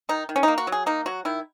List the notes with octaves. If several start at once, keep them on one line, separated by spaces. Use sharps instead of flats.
D#3 D#4
D#3
C#4
A#3 D#4
F#4
F#3
G#4
A#3 D#4
F#3 F#4
D#3 E4